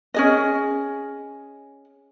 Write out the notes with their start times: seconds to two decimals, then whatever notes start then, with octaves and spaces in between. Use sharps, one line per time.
0.14 C#4 G#4 D#5